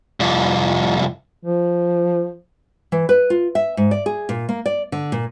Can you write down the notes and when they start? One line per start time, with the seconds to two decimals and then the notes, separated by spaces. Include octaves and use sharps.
0.20 C2 F2
1.43 F3
2.92 E3
3.09 B4
3.30 F4
3.55 E5
3.77 G#2
3.91 D5
4.06 G#4
4.29 A#2
4.49 A#3
4.66 D5
4.92 D3
5.12 A#2